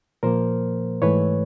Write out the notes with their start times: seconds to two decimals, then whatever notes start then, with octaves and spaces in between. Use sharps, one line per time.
0.23 A#2 F3 A#3 A#4 C5
1.02 G#2 E3 A3 B4 C#5